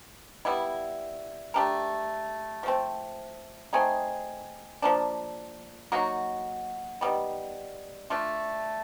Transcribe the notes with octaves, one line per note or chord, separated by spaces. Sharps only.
G3 B3 E4
A3 D4 G4 A#4
F3 A3 C4
A3 C4 D#4 G#4
F3 A#3 D4
F#3 A#3 D#4 F#4
D#3 G3 B3
A3 D4 F4